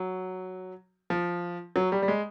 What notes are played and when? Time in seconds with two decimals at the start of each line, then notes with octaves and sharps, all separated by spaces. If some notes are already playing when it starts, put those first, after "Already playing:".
Already playing: F#3
1.10 F3
1.76 F#3
1.92 G3
2.02 G3
2.08 G#3